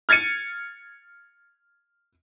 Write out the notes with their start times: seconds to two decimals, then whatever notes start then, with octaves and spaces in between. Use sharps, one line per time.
0.09 F6 G#6 A6 C#7 D#7